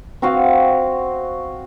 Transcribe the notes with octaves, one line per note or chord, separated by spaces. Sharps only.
C4 F#4 F5